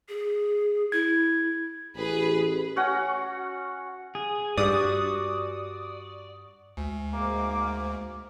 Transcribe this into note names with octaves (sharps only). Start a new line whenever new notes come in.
G#4
E4 G#6
A1 G#4 B4
C#4 F#4 F#5
G#4
G2 F#4 D5 D#6
D2 G#3
G#2 A#3 D6